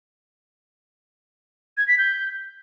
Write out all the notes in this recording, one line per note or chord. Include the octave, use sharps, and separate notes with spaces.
G#6
B6
G6